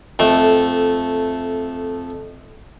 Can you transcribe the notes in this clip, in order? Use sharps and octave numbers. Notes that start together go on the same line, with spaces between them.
F2 A3